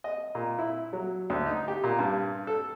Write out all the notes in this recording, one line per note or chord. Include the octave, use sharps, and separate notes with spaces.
D#5
A#2
E4
F#3
D2
D#4
G4
A#2
G2
A4